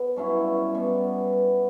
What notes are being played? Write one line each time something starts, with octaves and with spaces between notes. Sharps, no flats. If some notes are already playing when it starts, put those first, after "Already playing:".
Already playing: B3
G2 F#3 C#4 E4
B2 G3 B3